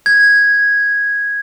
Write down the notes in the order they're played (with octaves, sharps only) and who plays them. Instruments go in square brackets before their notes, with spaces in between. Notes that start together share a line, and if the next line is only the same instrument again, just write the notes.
[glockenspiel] G#6